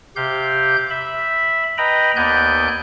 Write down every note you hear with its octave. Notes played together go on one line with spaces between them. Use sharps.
C3 G4 F5 G6
E5 B5
B4 D#5 G5 A#5 B5
D#2 B3 D5 G#5 F#6 G6